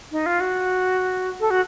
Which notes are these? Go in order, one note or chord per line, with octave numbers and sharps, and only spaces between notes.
D#4
F4
F#4
A4
F#4